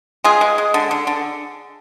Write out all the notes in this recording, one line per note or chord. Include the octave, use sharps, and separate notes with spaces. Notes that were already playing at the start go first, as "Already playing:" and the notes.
G#3 F4 G#4
G#3
G#3
D3
D3
D3